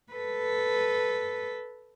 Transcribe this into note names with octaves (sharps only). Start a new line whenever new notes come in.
A4 B4